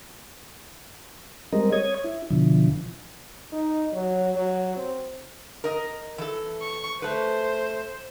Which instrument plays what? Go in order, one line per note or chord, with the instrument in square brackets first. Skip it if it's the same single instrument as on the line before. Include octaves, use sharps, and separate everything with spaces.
[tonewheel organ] G3 G#3 C4 A#4 D#5
C#5 D#6 G#6
E4
B2 D3 E3 F3
[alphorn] D#4
F#3
F#3
C4
[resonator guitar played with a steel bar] A#4 D#5
E3 A4
[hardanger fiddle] C#6
[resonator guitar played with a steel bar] A3 B4 [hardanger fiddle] C5